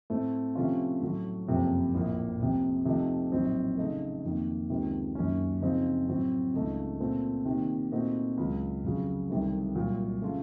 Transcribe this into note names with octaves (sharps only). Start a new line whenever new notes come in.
A2 A3 C4
C3 F3 A3 C#4 F4
A2 F#3 A3
F#1 F2 C3 F3 A3
A#1 A2 F3 A#3
F1 F2 C3
C3 F3 A3 D#4
A#1 A2 F#3 C4 D#4
C#3 A3 D#4 A4
F2 D#3 A#3
C#2 C3 D#3
F#2 D#3 A#3 C#4
C#3 F3 C4 D#4
A2 F#3 C4
C#2 C#3 A3 D#4
A#2 A3 C4
C3 D#3 A#3
A#2 A3 C4 D#4 F#4
C#2 C#3 F#3
F1 F2 C#3 F#3
C2 C3 D#3 A3
C2 A#2 F#3 A#3 F4
C#3 A3 C#4 F4